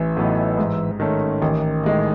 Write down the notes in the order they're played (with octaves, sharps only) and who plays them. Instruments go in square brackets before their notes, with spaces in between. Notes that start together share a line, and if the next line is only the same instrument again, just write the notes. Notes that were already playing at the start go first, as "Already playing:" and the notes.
Already playing: [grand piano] A1 [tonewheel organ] E3
[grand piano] A2 F#3 B3 D#4
G#2
D#3 A3 C#4
[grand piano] A1 [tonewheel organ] D#3
[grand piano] A2 G#3 D#4